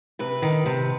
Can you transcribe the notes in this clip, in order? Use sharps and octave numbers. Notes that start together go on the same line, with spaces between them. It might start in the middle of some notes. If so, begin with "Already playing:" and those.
C3 B4
D#3
C3